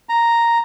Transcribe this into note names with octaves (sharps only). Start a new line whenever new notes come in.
A#5